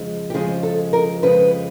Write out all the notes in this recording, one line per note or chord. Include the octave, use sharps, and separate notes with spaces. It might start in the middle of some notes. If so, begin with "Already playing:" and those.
Already playing: F2 C#3 F3 G#3
G4
F2 C#3 F3 G#3 G#4
A4
A#4
F2 C#3 F3 G#3 B4